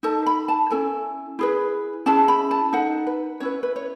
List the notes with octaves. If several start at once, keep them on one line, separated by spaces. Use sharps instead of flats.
D#4 A4 A5
B5
A5
C#4 E4 A4 G#5
E4 G#4 B4
C#4 E4 G#4 A5
B5
A5
D#4 A4 F#5
B4
C#4 E4 B4 C#5
B4
C#5